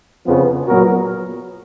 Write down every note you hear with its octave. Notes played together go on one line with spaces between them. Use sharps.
F2 C#3 F3 B3
A#2 F#3 B3 F#4 A#4